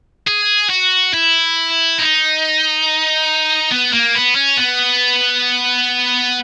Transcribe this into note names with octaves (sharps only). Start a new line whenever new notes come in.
G#4
F#4
E4
D#4
B3
A#3
B3
C#4
B3